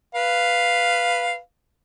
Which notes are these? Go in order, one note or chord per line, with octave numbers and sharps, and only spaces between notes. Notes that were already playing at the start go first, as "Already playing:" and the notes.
B4 F5